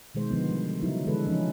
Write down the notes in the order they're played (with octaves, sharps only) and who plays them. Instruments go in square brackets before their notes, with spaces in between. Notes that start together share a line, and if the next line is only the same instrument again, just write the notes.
[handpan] B2 D#3 G#3 C5
D3 F3 B3
G3
C#3 F#3 D#4 E4
D3 E3 G#3 D4 A4 B4
E3 F3 C#4 D#4